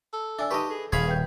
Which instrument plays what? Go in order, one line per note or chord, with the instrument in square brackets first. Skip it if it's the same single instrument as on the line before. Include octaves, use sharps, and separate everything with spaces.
[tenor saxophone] A4
[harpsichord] D4 [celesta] E5 G#5 E6
[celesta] D#4 A5 C#6 [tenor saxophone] G4 [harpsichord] B4 D#5
[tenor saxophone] G#4 [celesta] A4
[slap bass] D#1 [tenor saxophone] G#4 [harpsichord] C#5 F5 B5 [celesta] G#6
[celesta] B4 G5 G6